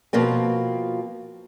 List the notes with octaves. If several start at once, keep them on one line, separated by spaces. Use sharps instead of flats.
B2 F3 A#3 C4